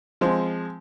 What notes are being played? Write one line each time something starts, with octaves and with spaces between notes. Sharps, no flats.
F3 G#3 C4